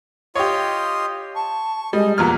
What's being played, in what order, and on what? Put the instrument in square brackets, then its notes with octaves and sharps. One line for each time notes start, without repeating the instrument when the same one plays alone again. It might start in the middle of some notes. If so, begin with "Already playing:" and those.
[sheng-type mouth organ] F4 D#5 C6 [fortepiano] G4 C#5
[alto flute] A5 [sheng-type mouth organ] C#6
[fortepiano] G3 [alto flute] G#3 [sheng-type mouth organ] D#5
[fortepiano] E2 A#2 F6 [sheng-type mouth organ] F#4 [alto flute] A#5